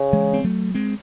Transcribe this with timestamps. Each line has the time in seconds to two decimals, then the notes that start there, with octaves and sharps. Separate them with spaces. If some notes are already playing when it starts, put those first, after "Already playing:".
Already playing: C#3
0.13 E3 G#3
0.33 C4
0.44 F#3 A3
0.74 G#3 C4